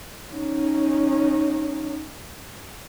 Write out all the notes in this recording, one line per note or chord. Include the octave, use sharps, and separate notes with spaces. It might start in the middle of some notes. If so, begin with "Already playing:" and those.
C#4 D#4